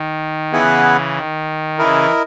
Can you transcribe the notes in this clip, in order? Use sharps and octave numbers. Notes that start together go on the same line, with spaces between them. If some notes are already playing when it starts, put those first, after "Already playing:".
Already playing: D#3
C#3 E3 B3 E4 G#4 B4 F#5
D#3
C#3 E3 E4 A#4 D#5